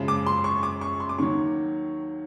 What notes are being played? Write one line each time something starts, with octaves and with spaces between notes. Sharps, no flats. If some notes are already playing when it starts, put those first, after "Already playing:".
Already playing: F#2 C#3 F3 G#3
D6
C6
C#6
D6
C#6
C6
D6
D#2 D#3 F#3 C#6